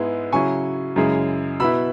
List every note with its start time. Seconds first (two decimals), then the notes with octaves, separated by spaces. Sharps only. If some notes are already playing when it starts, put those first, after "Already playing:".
Already playing: G#2 G#3 B3 E4
0.33 C#3 F#3 E4 G#5 C#6
0.96 F#2 C#3 G#3 E4
1.60 B2 B3 E4 B5 E6